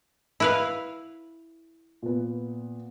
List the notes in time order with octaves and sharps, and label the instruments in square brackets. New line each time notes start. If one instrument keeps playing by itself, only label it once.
[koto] E4 B4 F5
[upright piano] A#2 B3